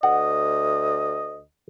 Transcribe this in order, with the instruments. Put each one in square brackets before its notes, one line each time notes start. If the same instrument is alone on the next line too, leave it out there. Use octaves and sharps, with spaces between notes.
[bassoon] D2 [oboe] D#5 [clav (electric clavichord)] F#5